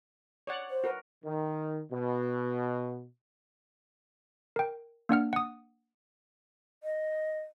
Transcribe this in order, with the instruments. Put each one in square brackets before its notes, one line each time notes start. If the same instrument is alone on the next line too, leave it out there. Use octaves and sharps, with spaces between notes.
[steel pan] C#5 D5 F#5
[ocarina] C5
[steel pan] F#4 A#4 B4
[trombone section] D#3
B2
[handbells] A#4 G5
A#3 D4 F#5 F6
F#5 D#6
[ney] D#5